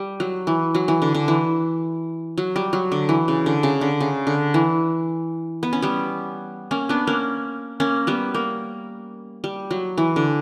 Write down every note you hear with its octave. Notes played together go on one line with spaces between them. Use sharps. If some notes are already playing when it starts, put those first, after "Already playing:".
Already playing: G3
F#3
E3
F#3
E3
D3
D3
E3
F#3
G3
F#3
D3
E3
C#3
D3
C#3
D3
C#3
D3
E3
B3
C#4
G3 B3
A#3 C#4
B3 D4
A#3 C#4
A#3 C#4
G3 B3
A#3
G3
F#3
E3
D3